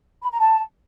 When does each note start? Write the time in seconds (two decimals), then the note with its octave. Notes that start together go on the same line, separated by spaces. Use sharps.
0.21 B5
0.30 A#5
0.40 A5